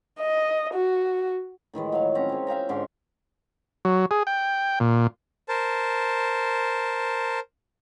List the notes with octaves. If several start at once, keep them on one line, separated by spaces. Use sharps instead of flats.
D#5
F#4
A2 D#3 E3 G#3
F#3 C#5 F5
C4 C#4 A#5
G#4 C#5
E5 F5 G5 A#5
G#2 D3 C#4 C6
F#3
G#4
G5
A#2
A#4 C5 A5